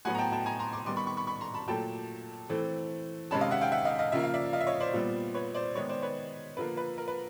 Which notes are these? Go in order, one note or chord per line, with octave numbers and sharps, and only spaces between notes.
A2 F#3 B3 F#5 G#5
A#5
G5 A5
G5 A5
G#5 A#5
A#5 C6
C6 D6
D#3 G3 B3 C6 D6
B5 C#6
B5 C#6
B5 C#6
B5 C#6
A#5 C6
A5 B5
A#2 F#3 A3 G5 A5
E3 A3 C4
C3 D#3 G#3 C#4 A5 B5
D#5 F5
E5 F#5
F5 G5
E5 F#5
D#5 F5
D#5 F5
C#3 F3 A#3 E5
F5
D5 E5
D#5 F5
E5
C#5 D#5
C5 D5
A#2 G3 B3
B4 C#5
C5 D5
D#3 G#3 B3 C#5 D#5
C5 D5
B4 C#5
D3 F3 A#3 B4
B4
A#4
B4